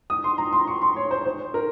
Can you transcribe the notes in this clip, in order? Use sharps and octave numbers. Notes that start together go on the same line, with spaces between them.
D#6
C6
A#5
C6
C#6
C6
C#5
C5
C5
A#4